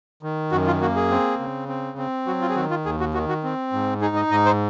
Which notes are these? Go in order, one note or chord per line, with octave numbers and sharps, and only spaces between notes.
D#3
F#2 F#4
F4
A#3 F#4
G#4
C4
C#3
C4
C4
F#3 F#4
F4
G#4
D#3 F#4
F4
D#2 G#4
F#4
D#3 F#4
F#4
C4
G#2
D#4 G#4
D#5
G#2 D#5
C5